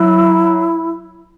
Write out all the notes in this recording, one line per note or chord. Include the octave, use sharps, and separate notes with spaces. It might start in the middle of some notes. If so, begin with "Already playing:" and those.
Already playing: F#3 E4